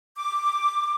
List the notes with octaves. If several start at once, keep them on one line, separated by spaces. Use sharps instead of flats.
D6